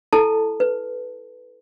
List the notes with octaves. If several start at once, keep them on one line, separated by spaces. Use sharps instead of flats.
E4 A4 A5
B4